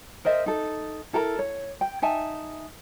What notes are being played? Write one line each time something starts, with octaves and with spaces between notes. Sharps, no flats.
A#4 C5 D#5 E5
D#4 A4
E4 A4 A#4 A#5
C#5
G5
D#4 E5 G#5 A5